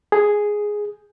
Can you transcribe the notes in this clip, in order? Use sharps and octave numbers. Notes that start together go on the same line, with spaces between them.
G#4